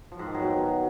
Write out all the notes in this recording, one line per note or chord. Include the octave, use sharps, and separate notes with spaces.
F3
G#2
D#3
F#3
B2